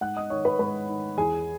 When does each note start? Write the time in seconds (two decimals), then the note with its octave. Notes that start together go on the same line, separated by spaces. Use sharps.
0.01 G#2 F#5 F#6
0.16 D#5 D#6
0.30 D#3 C#5 C#6
0.45 B4 B5
0.59 G#2 B4 B5
0.89 D#3
1.18 E2 G#4 G#5